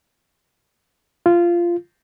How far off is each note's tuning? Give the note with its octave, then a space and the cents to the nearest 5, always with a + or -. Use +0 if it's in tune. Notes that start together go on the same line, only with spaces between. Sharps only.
F4 -15